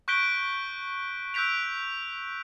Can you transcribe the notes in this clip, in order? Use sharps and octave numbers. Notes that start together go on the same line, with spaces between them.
C#6 F#6 G6 B6 D7 G7
E6 F#6 G6 B6 D7 F7